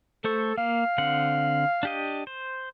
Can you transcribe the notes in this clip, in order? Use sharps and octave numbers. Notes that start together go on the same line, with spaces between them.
A3 A4 C5 C#6
A#3 F5
D3 C4 F#5
D4 G4 D#5
C5